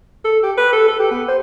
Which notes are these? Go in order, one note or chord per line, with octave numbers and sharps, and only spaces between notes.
A4
G4
B4
A4
A4
G4
B3
C5